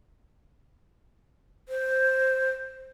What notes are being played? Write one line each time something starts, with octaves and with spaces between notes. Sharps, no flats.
C5